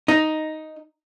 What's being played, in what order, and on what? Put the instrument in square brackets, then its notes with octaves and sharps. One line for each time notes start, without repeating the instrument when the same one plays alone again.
[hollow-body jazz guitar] D#4